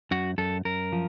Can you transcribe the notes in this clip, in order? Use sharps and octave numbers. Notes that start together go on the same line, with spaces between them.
F#2 F#4
F#2 A4
F#2 A#4
F3